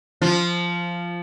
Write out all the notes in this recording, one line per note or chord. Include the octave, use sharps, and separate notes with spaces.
F3 F4